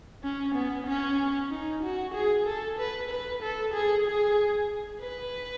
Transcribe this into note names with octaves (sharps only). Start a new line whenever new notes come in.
C#4
B3
C#4
D#4
F#4
G#4
A4
B4
B4
A4
G#4
G#4
B4